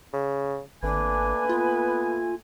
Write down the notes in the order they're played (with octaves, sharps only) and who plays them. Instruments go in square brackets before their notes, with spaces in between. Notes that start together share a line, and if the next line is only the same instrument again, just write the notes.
[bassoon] C#3
[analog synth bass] G#1 [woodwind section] A3 A#3 G#5 [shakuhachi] D4 [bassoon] B4
[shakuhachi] B3 [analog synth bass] F4